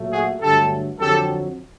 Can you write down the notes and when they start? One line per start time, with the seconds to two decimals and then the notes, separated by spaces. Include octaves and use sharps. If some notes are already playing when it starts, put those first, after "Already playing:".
Already playing: A#2 F#3 A3
0.12 F#4 G#4
0.41 G2 D3 F#3 A3 G4 A4
0.99 F2 D3 F#3 G4 A4